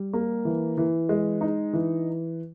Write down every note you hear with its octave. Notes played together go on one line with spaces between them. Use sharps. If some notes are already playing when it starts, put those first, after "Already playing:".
Already playing: G3
A#3
E3
E3
G#3
D#4
E3